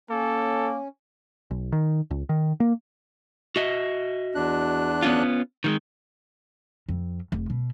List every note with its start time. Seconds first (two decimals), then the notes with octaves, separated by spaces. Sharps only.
0.10 A#3 C#4 A4
1.51 B1
1.72 D#3
2.11 C#2
2.29 D#3
2.60 A#3
3.56 F#4 D#5 E5
4.35 E2 D4 F#6
5.03 B3 C#4 F4
5.64 D#3 G3 G#3
6.89 F2
7.32 F1
7.50 B2